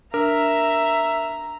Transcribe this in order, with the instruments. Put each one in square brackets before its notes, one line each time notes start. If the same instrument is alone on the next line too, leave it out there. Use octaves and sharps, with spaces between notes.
[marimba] D4 [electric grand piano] A#4 [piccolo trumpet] E5 [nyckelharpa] A#5